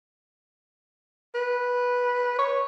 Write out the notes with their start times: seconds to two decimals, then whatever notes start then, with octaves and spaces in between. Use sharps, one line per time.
1.35 B4
2.39 C#5